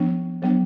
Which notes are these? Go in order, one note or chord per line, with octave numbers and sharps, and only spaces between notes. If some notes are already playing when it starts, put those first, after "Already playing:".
Already playing: F3 B3 D4
F#3 B3 D4